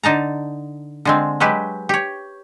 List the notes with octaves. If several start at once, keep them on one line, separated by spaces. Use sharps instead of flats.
D3 D#4 A5 A#5
D3 G#3 C4
F#3 G#3 G4 B4
G4 C#5